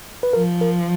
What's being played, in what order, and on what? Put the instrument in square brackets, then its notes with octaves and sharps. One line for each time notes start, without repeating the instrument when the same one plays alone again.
[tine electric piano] B4
[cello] F3 [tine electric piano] A#4
[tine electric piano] A#4